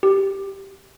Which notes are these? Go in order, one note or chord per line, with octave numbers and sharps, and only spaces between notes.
G4